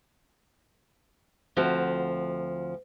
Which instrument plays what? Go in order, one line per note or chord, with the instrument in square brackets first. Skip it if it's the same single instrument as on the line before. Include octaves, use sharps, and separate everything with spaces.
[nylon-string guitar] D2 F3 C4 F#4 A4